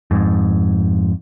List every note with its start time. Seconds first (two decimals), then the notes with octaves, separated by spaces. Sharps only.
0.11 F2 G#2